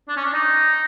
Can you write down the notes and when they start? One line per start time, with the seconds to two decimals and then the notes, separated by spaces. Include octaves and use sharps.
0.08 D4
0.17 C#4
0.25 D4
0.33 D#4